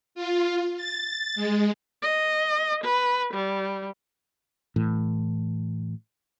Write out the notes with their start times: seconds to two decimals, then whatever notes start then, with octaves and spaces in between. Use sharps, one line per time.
0.15 F4
0.77 A6
1.36 G#3
2.02 D#5
2.84 B4
3.33 G3
4.76 A2 E3